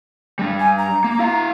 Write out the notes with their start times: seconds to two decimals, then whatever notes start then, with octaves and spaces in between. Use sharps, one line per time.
0.39 G3 D4
0.60 G#5
0.78 A#5
1.04 A#3
1.19 E4 F5